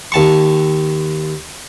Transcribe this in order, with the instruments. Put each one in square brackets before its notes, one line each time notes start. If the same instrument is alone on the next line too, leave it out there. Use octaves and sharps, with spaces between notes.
[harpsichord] D#2 A5 C#6